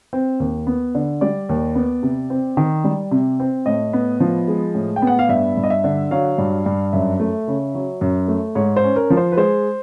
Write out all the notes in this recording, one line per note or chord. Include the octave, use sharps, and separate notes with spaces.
C4
D#2
B3
D3
G3 D5
D#2
B3
C3
C4
D#3
G3
C3
C4
A2 D#5
B3
F3
G#3
A2
G5
B3
F#5
F5
G2 E5
G2
D#5
E5
D3
F#3 F5
G2
G2
F#2 E5
A3
C#3
F#3
F#2
A3
G#2 C#5
C5
C#4
A#4
F3
C5
B4
G#3 C5